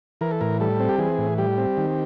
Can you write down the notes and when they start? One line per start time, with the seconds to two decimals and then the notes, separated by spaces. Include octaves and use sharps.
0.21 E3 A#4
0.31 A4
0.41 A2 A#4
0.60 G3 A4
0.80 C4
0.89 G4
0.98 E3 G#4
1.18 A2
1.38 G3 G4
1.58 C4
1.77 D#3